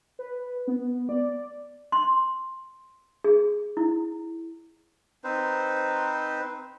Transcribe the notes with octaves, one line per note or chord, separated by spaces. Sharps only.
B4
B3
D5
C6
G#4
E4
C4 D#4 B4 C5